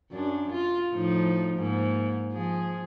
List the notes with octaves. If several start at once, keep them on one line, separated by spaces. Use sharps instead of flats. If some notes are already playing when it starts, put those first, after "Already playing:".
F#2 D4
F4
A2 F3 D#4
G#2 A#3
F3 G#4